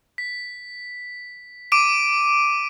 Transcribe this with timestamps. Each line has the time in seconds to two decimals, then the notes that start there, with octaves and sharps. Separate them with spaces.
0.18 B6
1.72 D6 D7 D#7